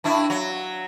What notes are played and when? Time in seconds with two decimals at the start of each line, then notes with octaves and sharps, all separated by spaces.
0.04 G2 D4 E4
0.30 F#3